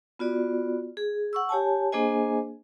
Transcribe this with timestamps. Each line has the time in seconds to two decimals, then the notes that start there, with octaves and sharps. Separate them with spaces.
0.19 B3 F4 F#4 D5
0.97 G#4
1.33 F#5 C#6 E6
1.49 G4 C#5 G#5 A5
1.92 A#3 D4 G#4 C5 D#5 G#5